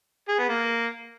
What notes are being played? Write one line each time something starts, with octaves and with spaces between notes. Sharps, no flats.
G#4
B3
A#3